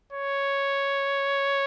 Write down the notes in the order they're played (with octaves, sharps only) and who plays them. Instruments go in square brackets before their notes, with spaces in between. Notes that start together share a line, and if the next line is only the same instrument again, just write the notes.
[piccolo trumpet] C#5